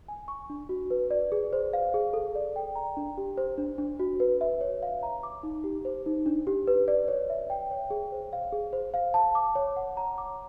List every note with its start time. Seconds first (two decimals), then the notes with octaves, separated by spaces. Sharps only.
0.08 G#5
0.28 C#6
0.50 D4
0.69 F#4
0.90 B4
1.11 D5
1.32 G#4
1.53 C5
1.73 F5
1.94 G#4
2.13 A4
2.35 D5
2.56 G5
2.75 A#5
2.97 D4
3.18 G4
3.37 C5
3.58 D4
3.78 D4
3.99 F#4
4.20 B4
4.41 E5
4.61 C#5
4.83 F5
5.03 A#5
5.23 D6
5.43 D#4
5.64 G4
5.85 C5
6.06 D#4
6.26 D4
6.47 G4
6.67 B4
6.88 D5
7.08 C#5
7.30 E5
7.50 G5
7.71 C#5
7.90 G#4
8.12 C5
8.33 F5
8.52 G#4
8.73 C5
8.94 F5
9.14 A5
9.35 D6
9.55 C#5
9.76 F#5
9.97 A#5
10.18 D6